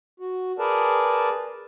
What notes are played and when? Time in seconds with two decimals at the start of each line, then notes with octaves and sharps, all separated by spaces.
0.20 F#4
0.59 G#4 A#4 B4 D5 A5